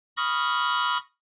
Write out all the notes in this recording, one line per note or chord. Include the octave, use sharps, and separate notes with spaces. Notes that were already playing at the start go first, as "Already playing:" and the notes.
B5 C#6 D#6 F6 A#6